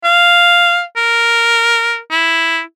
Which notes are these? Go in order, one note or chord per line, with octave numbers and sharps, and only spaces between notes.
F5
A#4
E4